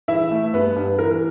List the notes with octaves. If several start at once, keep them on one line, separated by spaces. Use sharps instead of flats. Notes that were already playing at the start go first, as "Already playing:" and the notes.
E3 E4 E5
A3
G2 B3 B4
G2
E3 A#4